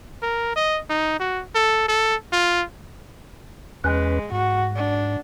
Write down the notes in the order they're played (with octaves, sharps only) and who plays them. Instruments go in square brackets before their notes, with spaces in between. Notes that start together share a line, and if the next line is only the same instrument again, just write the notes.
[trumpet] A#4
D#5
D#4
F#4
A4
A4
F4
[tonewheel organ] E2 C#4 B4 [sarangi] G#3
[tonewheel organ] G#2 [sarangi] F#4
[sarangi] D4